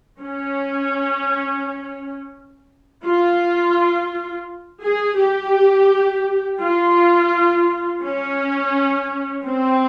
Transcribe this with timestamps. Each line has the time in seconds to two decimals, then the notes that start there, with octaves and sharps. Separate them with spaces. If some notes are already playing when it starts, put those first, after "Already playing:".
0.20 C#4
3.05 F4
4.83 G#4
5.18 G4
6.60 F4
8.03 C#4
9.45 C4